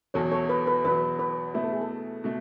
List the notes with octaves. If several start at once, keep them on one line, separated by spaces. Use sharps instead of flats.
E2 B2 F#3 A4 C#5
A4 C#5
B4
B4
E2 B2 F#3 B4
B4
B2 A3 E4 B4
A4
G#4
A4
B2 A3